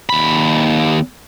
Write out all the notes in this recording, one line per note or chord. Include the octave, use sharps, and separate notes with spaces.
D#2 B5